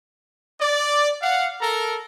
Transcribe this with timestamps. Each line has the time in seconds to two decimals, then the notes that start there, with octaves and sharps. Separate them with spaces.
0.60 D5
1.22 F5 F#5
1.61 A4 A#4 A#5